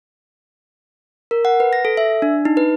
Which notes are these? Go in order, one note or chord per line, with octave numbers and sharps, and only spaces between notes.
A#4
F#5
B4
A#6
A4
E5
D4
D#4
B4